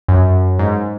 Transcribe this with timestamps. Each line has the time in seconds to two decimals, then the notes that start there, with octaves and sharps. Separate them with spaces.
0.08 F#2
0.59 G#2